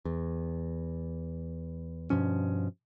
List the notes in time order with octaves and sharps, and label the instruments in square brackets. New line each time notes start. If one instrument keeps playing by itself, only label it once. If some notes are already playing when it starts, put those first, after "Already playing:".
[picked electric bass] E2
G2 B2 F3 C#4